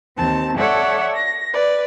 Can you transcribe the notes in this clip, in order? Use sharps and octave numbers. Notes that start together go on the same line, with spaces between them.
D#2 C4 A5
A4 C#5 D5 E5 F#5
A#6
B4 D5